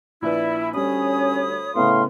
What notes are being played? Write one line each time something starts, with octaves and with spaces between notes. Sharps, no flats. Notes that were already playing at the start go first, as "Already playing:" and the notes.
A#1 E4 B4 D5
D2 G3 C#4 C#5 B5 D#6
A2 C#3 B3 F5 C6 F6